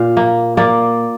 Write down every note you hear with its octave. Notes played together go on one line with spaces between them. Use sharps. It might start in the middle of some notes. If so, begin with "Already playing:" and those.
Already playing: A#2 F5
A#3
A#3 D5